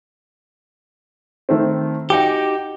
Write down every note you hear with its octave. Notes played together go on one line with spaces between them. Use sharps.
D#3 A3 C4
D#4 F#4 G4 G5 D6